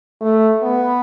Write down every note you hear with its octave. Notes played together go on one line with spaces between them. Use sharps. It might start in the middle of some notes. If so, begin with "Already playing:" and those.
A3
B3